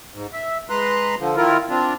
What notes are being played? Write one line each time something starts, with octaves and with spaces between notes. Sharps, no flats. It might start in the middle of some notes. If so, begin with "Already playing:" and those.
G#2
E5
G#3 B4 A#5 C6 F#6
D3 F3
D#3 E4 F4 A#4
C4 D4 F4